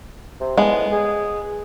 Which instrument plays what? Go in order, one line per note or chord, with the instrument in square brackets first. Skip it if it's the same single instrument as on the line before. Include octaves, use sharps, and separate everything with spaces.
[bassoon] C3
[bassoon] A2 [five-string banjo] G#3 B3
[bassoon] G#4